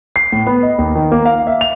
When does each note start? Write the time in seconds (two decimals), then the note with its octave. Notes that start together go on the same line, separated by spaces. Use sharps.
0.16 C7
0.32 A2
0.47 B3
0.63 D#5
0.78 D#2
0.95 D#3
1.12 A#3
1.25 F5
1.47 E5
1.61 F7